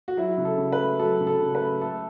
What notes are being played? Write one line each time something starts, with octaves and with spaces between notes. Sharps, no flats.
F#4
F#3 E4
C#3
A4
C#3
B4
A3
F#3 A4
C#3
A4
C#3
B4
A3
A3 A4